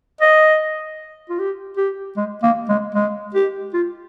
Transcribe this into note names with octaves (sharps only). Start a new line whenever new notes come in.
D#5
F4
G4
G4
G#3
A#3
G#3
G#3
G4
F4